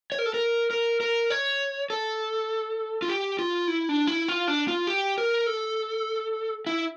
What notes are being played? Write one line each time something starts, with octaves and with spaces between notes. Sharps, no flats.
C#5
A#4
A4
A#4
A#4
A#4
C#5
A4
F4
G4
F4
E4
D4
E4
F4
D4
F4
G4
A#4
A4
E4